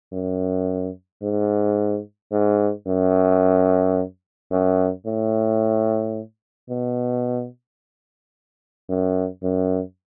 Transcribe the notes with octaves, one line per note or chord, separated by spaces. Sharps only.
F#2
G#2
G#2
F#2
F#2
A2
B2
F#2
F#2